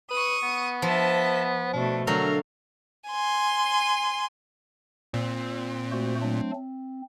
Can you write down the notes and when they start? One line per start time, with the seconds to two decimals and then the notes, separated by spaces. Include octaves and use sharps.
0.11 B4 C#6 D#6
0.43 B3
0.82 F3 D#5 E5 A5
1.73 B2 A3 D4
2.07 D3 F#3 A3 A#4 F5
3.10 G#5 C6
5.14 A#2 C4
5.92 A3 F#4 C5
6.22 F#3 A3 D4
6.55 C4